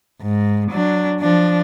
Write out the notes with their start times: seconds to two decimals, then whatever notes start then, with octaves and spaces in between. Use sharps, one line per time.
0.22 G#2
0.71 F#3 D4
1.21 F3 D4